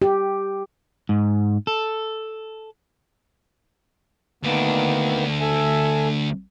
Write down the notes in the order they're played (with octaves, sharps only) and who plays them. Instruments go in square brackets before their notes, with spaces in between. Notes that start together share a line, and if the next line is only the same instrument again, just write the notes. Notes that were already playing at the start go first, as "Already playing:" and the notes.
[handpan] G4
[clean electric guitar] G#2
A4
[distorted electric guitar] D2 D4 [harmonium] D#3 A#3 B3
[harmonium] A4 E5 G#5